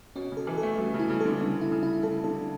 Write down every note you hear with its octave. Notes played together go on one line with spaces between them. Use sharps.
B2 C#4
C#3
A4
E3
A4
A3
B2 G3
C#3
E4
C#3
D3 A4
C#3 G3
E4
C#3
E4
C#3 A4
D3 A4